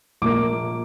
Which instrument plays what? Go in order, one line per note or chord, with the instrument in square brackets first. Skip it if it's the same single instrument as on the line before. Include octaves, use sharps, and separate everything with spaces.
[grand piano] A#1 A#2 A#3 D6